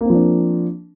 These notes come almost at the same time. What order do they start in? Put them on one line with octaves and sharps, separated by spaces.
A#3 C4 F3 D4